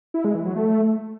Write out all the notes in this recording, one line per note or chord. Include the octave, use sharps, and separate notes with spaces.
E4
G#3
E3
F#3
A3